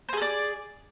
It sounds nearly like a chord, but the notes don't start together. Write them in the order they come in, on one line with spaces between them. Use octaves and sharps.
C5 G#4 A4 D5